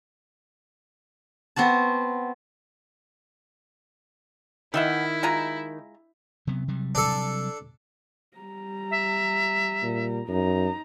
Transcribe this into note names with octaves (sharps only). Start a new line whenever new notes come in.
B3 C4 F#4 A5
D#3 E3 E4 E5 F#5
G#3 F4 A#5
C3 F#3 B3
C3 F#3 G3
D4 A4
G3 A#5
E5
A#2
F#2 D#4 A#5